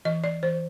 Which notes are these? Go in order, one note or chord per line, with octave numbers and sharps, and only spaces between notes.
E3 D#5
D5
E3 C5